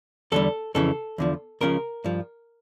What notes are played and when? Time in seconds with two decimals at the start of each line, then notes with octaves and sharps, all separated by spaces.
0.32 E2 D3 G3 A4
0.75 F2 C#3 E3 A4
1.18 E2 D3 F3
1.61 C#2 C#3 F3 A#4
2.04 G2 F3